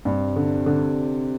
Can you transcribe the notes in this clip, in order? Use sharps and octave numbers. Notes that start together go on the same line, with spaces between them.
G2 C3
D3
D3